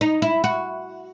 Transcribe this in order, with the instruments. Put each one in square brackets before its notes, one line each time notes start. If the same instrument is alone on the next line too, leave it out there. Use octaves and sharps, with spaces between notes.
[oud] D#4
E4
F#4